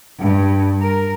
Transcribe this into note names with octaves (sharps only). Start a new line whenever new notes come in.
G2
A#4